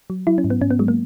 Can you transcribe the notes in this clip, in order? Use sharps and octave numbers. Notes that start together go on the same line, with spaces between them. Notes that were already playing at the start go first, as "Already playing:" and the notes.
F#3
F#3 E4
C#4
G#2
B3
G#2 C#4
B3
F#3 G#3
A#3